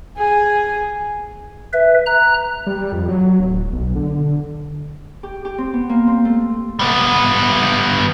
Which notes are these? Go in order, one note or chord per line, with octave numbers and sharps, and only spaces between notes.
G#4 G#5
B4 E5
A#5 F#6
G3
F2
F#3
D1
B1
D3
G4
G4
C4
B3
A#3
C4
A3
G3 B3